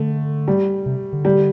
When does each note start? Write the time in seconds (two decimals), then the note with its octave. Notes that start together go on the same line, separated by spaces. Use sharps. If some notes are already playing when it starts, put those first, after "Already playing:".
Already playing: D3 A3
0.48 G3
0.86 C3
1.13 D3
1.25 G3